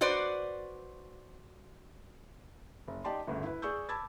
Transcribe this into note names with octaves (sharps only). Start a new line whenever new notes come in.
F#4 B4 C5 D5
F#1
D#4 G4 D5 A5 C6
G1 D2 C#3
E4 B4
G#4 D5 C#6 E6 G6
A5 B5 D6 E6 G#6 A6